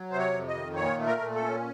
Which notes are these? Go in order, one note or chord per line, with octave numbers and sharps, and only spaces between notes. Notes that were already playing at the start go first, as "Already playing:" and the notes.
Already playing: F#3
C3 C5
C#5
F2
D#5
D#3
A#2 C#5
A3
A#4
A#2
A4
C#4